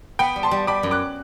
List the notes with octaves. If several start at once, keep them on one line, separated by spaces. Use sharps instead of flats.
B3 G5 B5
G3
A5 C6
G3
G3 B5 D6
F#2
D6 F#6